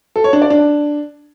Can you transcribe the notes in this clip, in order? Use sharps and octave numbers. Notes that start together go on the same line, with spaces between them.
A4
C#5
D4
D5
D4